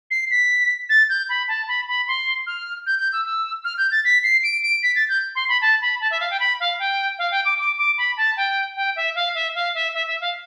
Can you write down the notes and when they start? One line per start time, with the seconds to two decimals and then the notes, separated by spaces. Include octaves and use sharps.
0.11 C7
0.31 B6
0.89 A6
1.09 G6
1.29 B5
1.48 A5
1.68 B5
1.88 B5
2.08 C6
2.47 F6
2.86 G6
2.99 G6
3.13 E6
3.25 E6
3.64 F6
3.78 G6
3.91 A6
4.05 B6
4.24 C7
4.43 D7
4.63 D7
4.83 B6
4.96 A6
5.09 G6
5.35 C6
5.49 B5
5.61 A5
5.81 B5
6.01 A5
6.11 E5
6.20 F5
6.31 G5
6.40 B5
6.60 F5
6.79 G5
7.19 F5
7.31 G5
7.45 D6
7.58 D6
7.78 D6
7.98 B5
8.17 A5
8.37 G5
8.76 G5
8.96 E5
9.15 F5
9.35 E5
9.55 F5
9.75 E5
9.94 E5
10.07 E5
10.21 F5